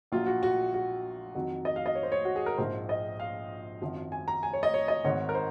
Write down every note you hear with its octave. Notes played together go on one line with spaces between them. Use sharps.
A#1 A#2 F#3 F4
F#4
F#4
F#4
F2 D#3 F#3
D#5
F5
D#5
C#5
C5
C#5
F#4
G#4
A#4
A#1 G#2 F3 C5
D#5
F5
G#1 F#2 F3
G#5
A#5
G#5
C#5
D#5
C#5
D#5
G#1 G#2 D#3 C#5
A#4
C5